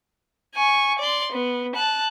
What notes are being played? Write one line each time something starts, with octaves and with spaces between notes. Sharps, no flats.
G#5 C#6
D5 C6
B3
A5 F#6